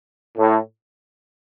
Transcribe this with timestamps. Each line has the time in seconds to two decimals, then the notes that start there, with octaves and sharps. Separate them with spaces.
0.38 A2